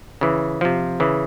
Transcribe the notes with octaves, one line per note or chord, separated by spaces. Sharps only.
C#3 E3
C3 F3
C#3 E3